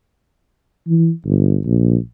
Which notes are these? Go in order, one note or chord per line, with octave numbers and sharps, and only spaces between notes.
E3
G1
A#1